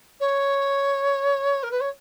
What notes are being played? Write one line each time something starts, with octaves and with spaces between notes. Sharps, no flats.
C#5
A#4
B4
C#5